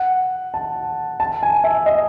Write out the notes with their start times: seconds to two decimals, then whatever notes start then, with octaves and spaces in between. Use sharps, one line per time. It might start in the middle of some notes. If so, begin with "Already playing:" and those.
Already playing: F#5
0.54 A5
1.20 A5
1.43 G#5
1.64 E5
1.86 D#5